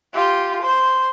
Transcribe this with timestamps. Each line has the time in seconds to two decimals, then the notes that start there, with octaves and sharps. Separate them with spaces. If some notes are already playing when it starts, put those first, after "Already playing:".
0.13 F4 G4
0.61 C5